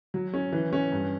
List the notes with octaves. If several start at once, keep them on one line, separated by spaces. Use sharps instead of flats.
F#3
C#4
E3
C#4
G2